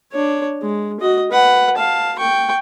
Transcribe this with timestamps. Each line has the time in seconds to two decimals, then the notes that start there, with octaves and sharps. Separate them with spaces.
0.13 D4 C#5
0.61 G#3
1.00 F#4 D#5
1.31 B4 F#5
1.77 F5 A5
2.19 G5 C#6